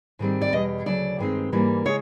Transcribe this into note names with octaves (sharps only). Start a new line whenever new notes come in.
G#2 D#3 G3 C4
D5
E2 B2 G3 D#5
D2 C#3 F#3 D5
G2 D#3 G#3 C4
G#2 E3 G3 A#3
C#3 G#3 C#5